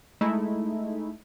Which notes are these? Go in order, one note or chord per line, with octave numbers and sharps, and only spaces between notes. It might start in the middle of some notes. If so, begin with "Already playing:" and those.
G#3 A3 D#4 E4